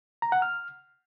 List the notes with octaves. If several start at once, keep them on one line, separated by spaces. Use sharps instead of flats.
A#5
F#5
F6